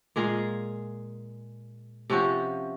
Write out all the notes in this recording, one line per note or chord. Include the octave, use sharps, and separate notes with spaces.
A#2 G#3 G#4 F5
C3 F3 C#4 F#4